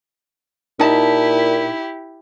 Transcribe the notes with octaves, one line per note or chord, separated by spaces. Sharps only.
A#2 D#4 E4 G4 A5